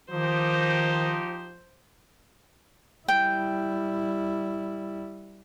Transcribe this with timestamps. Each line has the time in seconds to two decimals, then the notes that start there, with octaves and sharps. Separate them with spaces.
0.11 D#3 F3 D#4 G4 C5
3.08 G3 E4 G5